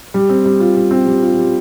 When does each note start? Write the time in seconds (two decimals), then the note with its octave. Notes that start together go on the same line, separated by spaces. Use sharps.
0.14 G3
0.29 C4
0.45 G3
0.60 F4
0.76 G3
0.91 C4
1.07 G3
1.23 F4
1.39 G3